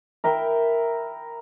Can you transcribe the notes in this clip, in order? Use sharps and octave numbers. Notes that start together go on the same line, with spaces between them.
A#4 E5 G5 B5